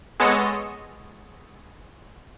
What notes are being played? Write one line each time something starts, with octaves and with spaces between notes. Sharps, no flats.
G#3 B3 A4 C#5 D#5